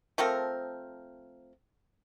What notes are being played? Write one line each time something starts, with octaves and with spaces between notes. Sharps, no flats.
F3 A3 C4 A#4